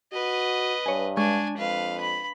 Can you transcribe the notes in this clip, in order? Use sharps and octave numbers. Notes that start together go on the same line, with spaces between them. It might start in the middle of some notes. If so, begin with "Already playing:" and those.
F#4 B4 D#5
G2 C#5 G#5
G#3 D4 G#5 C#6
F2 B4 F5
B5